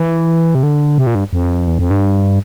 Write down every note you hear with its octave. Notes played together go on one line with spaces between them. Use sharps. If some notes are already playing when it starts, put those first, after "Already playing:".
Already playing: E3
C3
D3
C3
A#2
G2
F2
E2
F2
G2